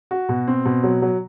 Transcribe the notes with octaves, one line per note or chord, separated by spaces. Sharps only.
F#4
B2
C4
B2
F#3
F#3